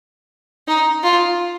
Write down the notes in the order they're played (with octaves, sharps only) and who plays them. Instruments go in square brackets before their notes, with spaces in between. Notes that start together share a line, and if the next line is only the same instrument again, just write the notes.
[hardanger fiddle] D#4
F4